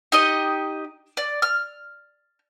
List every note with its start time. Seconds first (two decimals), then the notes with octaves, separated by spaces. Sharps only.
0.12 D#4 G4 D#5
1.17 D5
1.42 F6